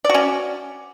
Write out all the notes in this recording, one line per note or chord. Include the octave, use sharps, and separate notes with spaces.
C#4 F#4 D5